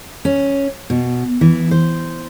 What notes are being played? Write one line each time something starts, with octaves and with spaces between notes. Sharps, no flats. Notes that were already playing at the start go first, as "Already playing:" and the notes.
C#4
B2
E3
C5